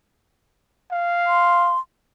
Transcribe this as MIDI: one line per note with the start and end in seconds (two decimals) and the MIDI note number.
0.91 1.74 77
1.27 1.79 84